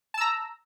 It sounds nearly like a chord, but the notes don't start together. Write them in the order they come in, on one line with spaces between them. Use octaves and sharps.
A5 E6 A#5